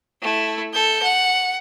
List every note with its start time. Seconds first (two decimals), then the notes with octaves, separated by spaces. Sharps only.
0.22 A3 E4
0.73 A4 G6
1.03 F#5